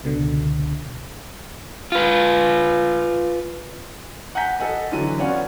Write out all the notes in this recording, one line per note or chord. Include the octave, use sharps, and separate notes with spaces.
C#2 B2 D3
F4 B4
F#5 G#5 A#5 G6 B6
A4 D#5 F#5 G#5
D3 E3 F#3 D#7
B3 C#4 F4 D5 F#5